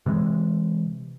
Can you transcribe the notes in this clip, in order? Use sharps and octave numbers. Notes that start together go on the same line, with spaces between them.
C3 E3 G#3